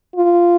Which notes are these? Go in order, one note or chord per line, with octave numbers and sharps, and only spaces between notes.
F4